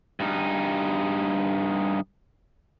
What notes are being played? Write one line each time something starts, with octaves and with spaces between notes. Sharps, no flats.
G2 D#4